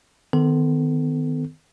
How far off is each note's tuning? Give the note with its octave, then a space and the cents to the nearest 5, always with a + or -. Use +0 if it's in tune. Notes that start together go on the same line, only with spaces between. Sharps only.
D#3 -5 B3 +35 A4 +0